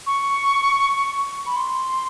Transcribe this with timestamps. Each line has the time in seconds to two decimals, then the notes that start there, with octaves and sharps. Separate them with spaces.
0.06 C#6
1.46 B5
1.56 C6